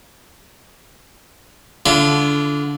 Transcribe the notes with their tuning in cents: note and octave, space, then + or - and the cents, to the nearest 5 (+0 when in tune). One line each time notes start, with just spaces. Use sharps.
D3 -20 F4 -35 B5 +20